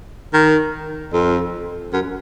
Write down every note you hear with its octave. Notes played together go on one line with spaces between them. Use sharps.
D#3
F2
F#2